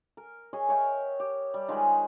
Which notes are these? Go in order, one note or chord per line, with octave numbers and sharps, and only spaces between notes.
A#4
G#4 C#5 D#5
A#4 C#5 E5 G5
G4
G3
D#3 F3 G#3 G#4